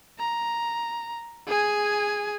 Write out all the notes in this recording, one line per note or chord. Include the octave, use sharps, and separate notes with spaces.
A#5
G#4 G#5